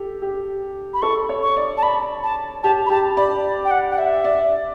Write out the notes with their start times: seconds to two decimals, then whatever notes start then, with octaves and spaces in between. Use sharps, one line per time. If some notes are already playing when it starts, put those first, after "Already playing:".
Already playing: G4 A4
0.22 G4
0.94 B5
1.02 A4 C#6
1.29 C#5
1.43 C#6
1.56 D5
1.78 A5
1.83 D5 B5
2.23 A5
2.63 G4 A5
2.86 B5
2.90 G4 A5
3.17 D5 B5
3.65 G5
3.71 F#5
3.91 F#5
3.98 E5
4.24 D5